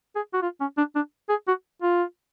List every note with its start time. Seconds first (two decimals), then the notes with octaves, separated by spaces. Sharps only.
0.16 G#4
0.34 F#4
0.42 F4
0.60 C#4
0.77 D4
0.95 D4
1.29 G#4
1.48 F#4
1.82 F4